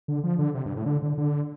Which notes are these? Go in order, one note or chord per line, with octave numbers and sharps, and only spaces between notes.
D3
F3
D3
C3
G2
A2
D3
D3
D3